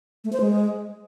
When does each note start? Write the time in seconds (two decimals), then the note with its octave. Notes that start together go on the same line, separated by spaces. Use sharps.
0.24 A3
0.33 C5
0.41 G#3